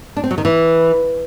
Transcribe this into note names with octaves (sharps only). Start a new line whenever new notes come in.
D4
C4
F#3
D#3
E3